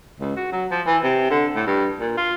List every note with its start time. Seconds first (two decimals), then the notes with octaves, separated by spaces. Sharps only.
0.20 C#2
0.36 F#4
0.52 F#3
0.71 F3
0.87 E3
1.04 C3
1.30 D3
1.55 A2
1.67 G2
2.00 A#2
2.17 F4